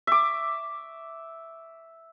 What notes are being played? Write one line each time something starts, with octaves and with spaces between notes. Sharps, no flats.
E5 D6